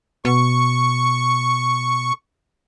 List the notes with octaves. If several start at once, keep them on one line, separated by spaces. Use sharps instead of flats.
B2 C#6